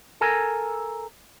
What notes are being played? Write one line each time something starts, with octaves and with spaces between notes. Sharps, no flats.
A4 A#4 G#5